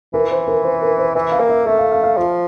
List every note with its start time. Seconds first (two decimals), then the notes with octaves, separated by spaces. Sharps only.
0.14 E3 A#4
0.31 C5
0.48 A#4
0.64 C5
0.82 A#4
0.98 C5
1.15 E3 E5
1.32 F5
1.40 A#3
1.49 E5
1.66 A3 E5
1.79 F5
1.92 F5
2.04 F5
2.17 F3